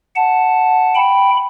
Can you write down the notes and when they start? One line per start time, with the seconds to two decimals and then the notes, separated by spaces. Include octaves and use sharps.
0.15 F#5 A5
0.95 G5 B5